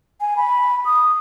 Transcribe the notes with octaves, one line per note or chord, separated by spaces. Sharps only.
G#5
B5
D#6